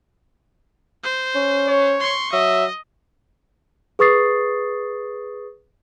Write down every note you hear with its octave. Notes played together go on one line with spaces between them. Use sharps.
C5
C#4
C#5
C6 C#6
F#3 D#5 E5
G#4 B4 C#6 D#6 A6 C7